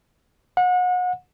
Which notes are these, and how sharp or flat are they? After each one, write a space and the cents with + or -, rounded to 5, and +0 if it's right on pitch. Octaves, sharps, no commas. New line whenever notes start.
F#5 -35